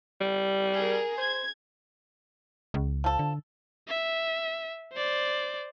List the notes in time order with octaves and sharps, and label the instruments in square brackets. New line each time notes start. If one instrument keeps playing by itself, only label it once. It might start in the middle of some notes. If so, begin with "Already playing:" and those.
[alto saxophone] G3
[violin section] G#4 A#4
[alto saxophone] C5 [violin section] G#6
[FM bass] C#2
[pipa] F3 A4
[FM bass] D3
[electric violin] E5
C5 D5